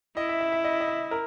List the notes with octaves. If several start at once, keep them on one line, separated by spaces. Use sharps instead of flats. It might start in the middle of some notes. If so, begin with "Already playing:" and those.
E4 D#5
E5
E5
E5
D#5
D#5
E5
A#4